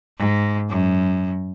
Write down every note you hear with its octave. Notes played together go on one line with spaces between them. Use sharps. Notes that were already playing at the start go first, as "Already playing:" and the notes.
G#2
F#2